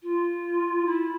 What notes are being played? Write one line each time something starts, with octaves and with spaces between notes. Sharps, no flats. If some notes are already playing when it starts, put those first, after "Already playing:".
F4
E4